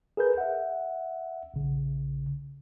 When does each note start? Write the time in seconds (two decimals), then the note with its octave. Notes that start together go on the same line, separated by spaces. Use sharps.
0.17 G#4 A#4 B4 G6
0.38 E5 F#5
1.54 A#1 C#3